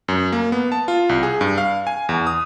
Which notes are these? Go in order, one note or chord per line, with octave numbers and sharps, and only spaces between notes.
F#2
A#3
B3
A5
F4
C2
G#4
G2
F5
G#5
E2
D#6